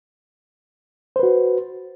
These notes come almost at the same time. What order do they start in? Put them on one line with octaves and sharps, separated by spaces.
C5 B4 F#4